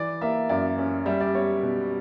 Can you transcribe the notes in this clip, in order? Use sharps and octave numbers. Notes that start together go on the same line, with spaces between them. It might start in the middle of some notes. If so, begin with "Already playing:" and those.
Already playing: E3 D5
A#3 E5
F#2 D5
C#4
G3 E5
D5
B3 C#5
B2